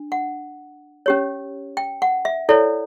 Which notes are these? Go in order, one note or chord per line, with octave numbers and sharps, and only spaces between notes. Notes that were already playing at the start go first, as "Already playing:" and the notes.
Already playing: D4
F#5
C#4 G4 C#5
G5
F#5
E5
E4 A4 C#5 D5